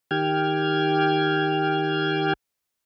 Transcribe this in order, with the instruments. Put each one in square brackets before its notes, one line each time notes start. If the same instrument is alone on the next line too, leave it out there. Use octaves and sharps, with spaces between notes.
[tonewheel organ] D#3 G4 G5 F6 G#6